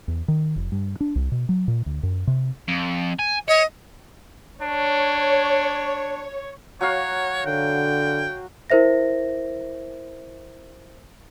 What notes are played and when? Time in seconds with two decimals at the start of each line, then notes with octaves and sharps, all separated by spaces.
0.08 E2
0.28 D#3
0.56 F1
0.72 G2
1.01 D4
1.16 C2
1.32 B2
1.49 F#3
1.68 A#2
1.86 D2
2.03 F#2
2.27 C3
2.68 F2
3.19 G#5
3.48 C#5 D#5
4.62 D4 C#5
6.81 F#3 F#4 C#5 F5
7.46 D3 G5
8.70 E4 A#4 C5 E5 A#6